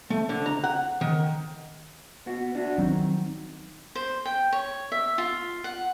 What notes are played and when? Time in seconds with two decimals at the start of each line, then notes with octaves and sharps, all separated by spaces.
0.10 A3
0.29 D3
0.46 A#5
0.64 F#5
1.01 D#3
2.26 B3 F#4
2.55 D4 F#4
2.78 D#3 F#3 C4
3.95 C5
4.25 G5
4.53 C#5
4.92 E5
5.18 F4
5.64 F#5